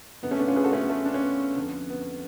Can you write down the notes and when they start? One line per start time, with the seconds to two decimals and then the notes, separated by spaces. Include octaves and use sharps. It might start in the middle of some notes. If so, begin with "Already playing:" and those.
0.23 F#2 D3 B3
0.31 A3 C#4
0.39 B3 D4
0.48 C#4 F4
0.56 G#4 B4
0.64 F#4 A4
0.73 A3 C#4
0.81 B3
0.90 A3
1.05 D4
1.14 C#4
1.22 B3
1.56 F2 D3
1.90 B3